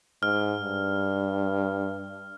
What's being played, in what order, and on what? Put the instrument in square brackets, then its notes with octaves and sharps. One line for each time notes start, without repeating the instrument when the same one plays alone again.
[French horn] G#2 [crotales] F6
[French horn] G2